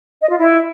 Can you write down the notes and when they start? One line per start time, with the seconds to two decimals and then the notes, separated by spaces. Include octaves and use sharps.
0.20 D#5
0.29 F4
0.38 E4